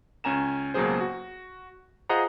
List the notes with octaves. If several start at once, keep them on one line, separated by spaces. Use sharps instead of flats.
C#2 C#4 G#5 A#5 E7
C#2 B2 F#3 A#3 G#4 C5
F#4
F4 G#4 C5 D#5 F#5 A#5